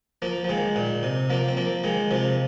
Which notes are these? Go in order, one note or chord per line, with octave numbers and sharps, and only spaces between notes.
F3 A#3
F3
D#3 G#3
A#2 D#3
C3
F3 A#3
C4
F3 A#3
D#3 G#3
C3 F3